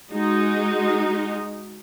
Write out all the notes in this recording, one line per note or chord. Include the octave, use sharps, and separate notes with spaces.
G#3 D#4 F#4